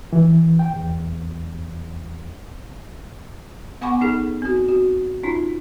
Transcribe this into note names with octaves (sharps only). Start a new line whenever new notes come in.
E3
G5
E2
B3 F#5 G#5 B5 C#6 D6
C#4 D#4 G#4 A4
C4 F#4
F#4
C#4 D#4 F4